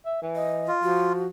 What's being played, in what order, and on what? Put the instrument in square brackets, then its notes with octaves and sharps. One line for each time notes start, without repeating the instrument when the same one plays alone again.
[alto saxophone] E5
E3
[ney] D#5
[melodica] F4
[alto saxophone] F3 [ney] F#4